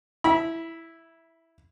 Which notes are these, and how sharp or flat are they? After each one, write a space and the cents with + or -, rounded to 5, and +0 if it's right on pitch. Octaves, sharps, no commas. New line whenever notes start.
E4 +0 B5 -30